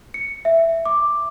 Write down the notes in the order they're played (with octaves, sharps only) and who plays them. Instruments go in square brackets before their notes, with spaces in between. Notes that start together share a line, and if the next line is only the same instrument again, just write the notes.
[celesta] C#7
E5
D6